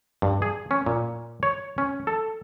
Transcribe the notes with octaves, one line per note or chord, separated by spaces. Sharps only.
G2
G#4
C#4
A#2
C#5
C#4
A4